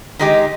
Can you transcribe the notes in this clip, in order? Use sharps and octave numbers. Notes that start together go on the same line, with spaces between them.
D#3 G#3 D#4 G4